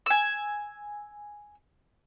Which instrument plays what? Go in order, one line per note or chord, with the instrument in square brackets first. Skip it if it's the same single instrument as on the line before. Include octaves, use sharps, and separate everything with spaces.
[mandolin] G#5 E6